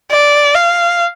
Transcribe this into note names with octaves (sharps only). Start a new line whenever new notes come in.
D5
F5